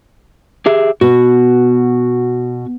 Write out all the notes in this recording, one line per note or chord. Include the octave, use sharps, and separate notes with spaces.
G4 G#4 E5
B2 F#4